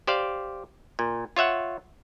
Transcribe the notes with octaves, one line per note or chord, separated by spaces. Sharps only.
G4 C5 D5 F5
A#2
F4 C#5 E5 F#5